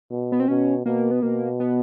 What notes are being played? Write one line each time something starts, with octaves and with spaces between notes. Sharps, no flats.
B2
B3
C4
B2 C#4
B2 A#3
B3
B2 A#3
B3